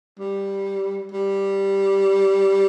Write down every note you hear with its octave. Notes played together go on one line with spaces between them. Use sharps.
G3
G3